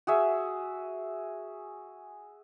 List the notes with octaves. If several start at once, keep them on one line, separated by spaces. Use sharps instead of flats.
F#4 G#4 E5